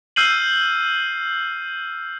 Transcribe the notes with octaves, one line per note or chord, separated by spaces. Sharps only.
E6 F6 G6 C7 D#7 F#7